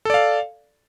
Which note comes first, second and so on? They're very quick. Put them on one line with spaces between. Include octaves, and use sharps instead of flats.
A4 D5 F5